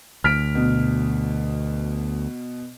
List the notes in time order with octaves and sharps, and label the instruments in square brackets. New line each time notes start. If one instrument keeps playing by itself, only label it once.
[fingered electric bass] D2 [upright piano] F6 B6 D7
[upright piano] B2